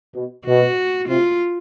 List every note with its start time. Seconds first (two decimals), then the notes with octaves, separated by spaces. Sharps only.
0.15 B2
0.46 B2 F#4
1.08 C3 F4